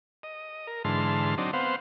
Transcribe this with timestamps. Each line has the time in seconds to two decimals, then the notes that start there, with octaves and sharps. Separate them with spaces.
0.23 D#5
0.67 A#4
0.85 G#2 D3 E3 A5 C6 F6
1.38 F#3 C4 D4 D#4
1.53 B3 C4 C5 F5 F#5